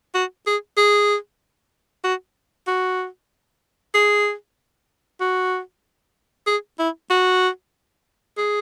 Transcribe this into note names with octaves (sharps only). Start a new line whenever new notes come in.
F#4
G#4
G#4
F#4
F#4
G#4
F#4
G#4
E4
F#4
G#4